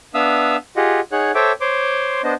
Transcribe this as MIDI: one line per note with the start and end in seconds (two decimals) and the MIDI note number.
0.14 0.56 59
0.14 0.56 62
0.14 0.56 76
0.14 0.56 77
0.14 0.56 87
0.14 0.56 88
0.76 1.00 65
0.76 1.00 67
0.76 1.00 68
0.76 1.00 75
0.76 1.00 78
1.12 1.32 63
1.12 1.32 68
1.12 1.32 73
1.12 1.32 78
1.12 1.32 90
1.35 1.52 69
1.35 1.52 72
1.35 1.52 73
1.35 1.52 76
1.35 1.52 79
1.35 1.52 86
1.61 2.22 72
1.61 2.22 73
1.61 2.22 84
1.61 2.22 86
2.23 2.34 59
2.23 2.34 62
2.23 2.34 72
2.23 2.34 75